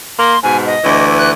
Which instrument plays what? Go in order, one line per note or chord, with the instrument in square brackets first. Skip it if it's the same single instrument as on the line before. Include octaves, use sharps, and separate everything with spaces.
[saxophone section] A#3 [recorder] C6
[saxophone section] G#2 B2 [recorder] G#5
[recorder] D#5
[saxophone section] D2 E3
[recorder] F#6